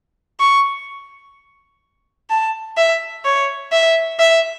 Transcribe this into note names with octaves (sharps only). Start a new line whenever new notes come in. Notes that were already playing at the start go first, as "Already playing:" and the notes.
C#6
A5
E5
C#5
E5
E5